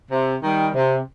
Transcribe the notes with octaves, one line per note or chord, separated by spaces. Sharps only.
C3
D#3 G3
C3